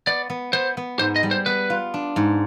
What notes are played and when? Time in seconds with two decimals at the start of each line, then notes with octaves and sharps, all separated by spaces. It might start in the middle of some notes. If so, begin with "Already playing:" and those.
0.07 B3 D5
0.30 B3
0.53 B3 C5
0.77 B3
0.99 G#2 C5
1.16 D#5
1.23 G3
1.31 C5
1.46 B3 B4
1.70 F4
1.94 D4
2.16 G#2